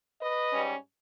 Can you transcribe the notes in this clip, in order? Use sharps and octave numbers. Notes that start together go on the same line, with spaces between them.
B4 D#5
G#2 G3 C#4